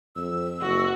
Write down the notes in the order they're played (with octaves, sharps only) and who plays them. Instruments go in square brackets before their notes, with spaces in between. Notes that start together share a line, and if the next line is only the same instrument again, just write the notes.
[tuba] F2 [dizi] E6
[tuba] F#1 [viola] F#4